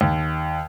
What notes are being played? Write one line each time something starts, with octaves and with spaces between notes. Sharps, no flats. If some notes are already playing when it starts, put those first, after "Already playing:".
D#2